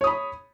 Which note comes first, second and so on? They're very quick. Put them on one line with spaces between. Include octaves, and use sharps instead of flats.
C#5 D#6 B5